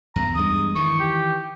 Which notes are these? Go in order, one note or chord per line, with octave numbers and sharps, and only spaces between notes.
E2 A#5
E2 G2 G#3 D#6
D#3 E3 C#6
G4